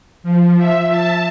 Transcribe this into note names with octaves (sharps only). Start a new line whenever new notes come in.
F3
E5
A5